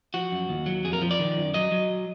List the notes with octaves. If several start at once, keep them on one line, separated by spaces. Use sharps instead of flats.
F3 F#4
F#2
D#2
F#3
F2 G#4
A#4
F3
D5
D#3
F#2
F#3 D#5
F#3